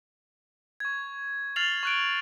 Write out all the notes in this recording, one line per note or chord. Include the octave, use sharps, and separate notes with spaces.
C#6 G#6
F6 A6 C7 F7 F#7
C#6 F#6 D7